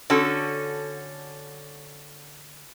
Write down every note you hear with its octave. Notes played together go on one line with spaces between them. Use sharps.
D3 C#4 F#4 A4